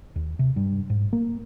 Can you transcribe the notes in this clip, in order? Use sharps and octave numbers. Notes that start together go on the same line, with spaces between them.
D#2
C3
G2
G#2
A#3